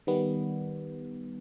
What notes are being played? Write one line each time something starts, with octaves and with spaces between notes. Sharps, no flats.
D#3 G3 B3